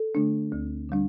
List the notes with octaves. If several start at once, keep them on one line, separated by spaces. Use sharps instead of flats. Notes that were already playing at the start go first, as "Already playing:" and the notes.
Already playing: A4
D3 A3 D4
D2
D3 G3 D4